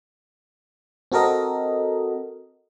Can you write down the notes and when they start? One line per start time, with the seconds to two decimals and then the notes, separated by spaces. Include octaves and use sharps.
1.12 C4 F#4 A4 A#4 D#5